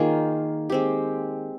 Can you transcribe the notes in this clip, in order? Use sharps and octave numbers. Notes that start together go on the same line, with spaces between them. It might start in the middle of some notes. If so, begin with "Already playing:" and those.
Already playing: D#3 A#3 F4 G#4
G#3 C4 G4